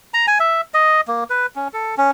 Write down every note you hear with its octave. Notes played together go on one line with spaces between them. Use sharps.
A#5
G#5
E5
D#5
A#3
B4
C#4
A4
C#4